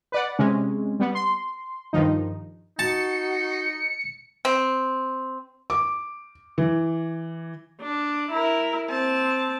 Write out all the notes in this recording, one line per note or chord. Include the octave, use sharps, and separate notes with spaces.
B4 D5 F#5
C3 G#3 C#4
G3 B3
C6
G2 D#3 F3 D#4
D#4 F#4 A5 C#7
C4
D6
E3
D4
E4 A#4
C4 A5